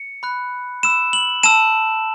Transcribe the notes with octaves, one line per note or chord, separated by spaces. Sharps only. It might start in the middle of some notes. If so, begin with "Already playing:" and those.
Already playing: C#7
B5 F#6
B5 E6 E7
F#7
A5 E6 E7